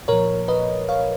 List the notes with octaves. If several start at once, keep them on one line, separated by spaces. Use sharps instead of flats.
A#2 F3 A#4 C#5
B4 D#5
C#5 F5